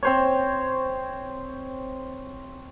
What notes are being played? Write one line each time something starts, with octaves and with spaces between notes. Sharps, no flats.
C4 C5 C#5